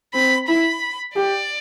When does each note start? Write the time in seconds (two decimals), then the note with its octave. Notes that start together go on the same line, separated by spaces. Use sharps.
0.14 C4 B5
0.48 E4 B5
1.16 G4 D5